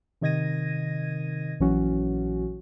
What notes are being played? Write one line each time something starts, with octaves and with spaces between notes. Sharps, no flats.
C3 D#3 D#5 G#6 A#6 D#7
A#1 E3 F#3 C#4 F#4